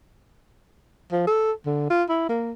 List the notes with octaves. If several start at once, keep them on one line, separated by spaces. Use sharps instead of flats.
F3
A4
D3
F4
E4
A#3